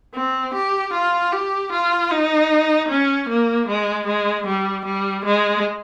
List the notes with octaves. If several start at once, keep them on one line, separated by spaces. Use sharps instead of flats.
C4
G4
F4
G4
F4
D#4
C#4
A#3
G#3
G#3
G3
G3
G#3